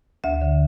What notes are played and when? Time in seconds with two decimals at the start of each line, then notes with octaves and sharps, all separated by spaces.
0.24 D2 E5
0.42 D3